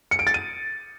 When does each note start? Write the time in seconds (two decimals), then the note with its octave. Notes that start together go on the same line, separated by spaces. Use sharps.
0.11 C#7
0.19 D7
0.27 A6
0.34 D#7